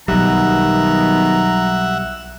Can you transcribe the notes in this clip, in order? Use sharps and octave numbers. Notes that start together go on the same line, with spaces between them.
B1 B2 D#3 F#3 G3 E5 F#5 A#5